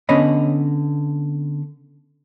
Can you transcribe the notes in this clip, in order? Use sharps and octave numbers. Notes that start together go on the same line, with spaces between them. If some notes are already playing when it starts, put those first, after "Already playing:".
D3 B3 C#4 C#5 D#5 B5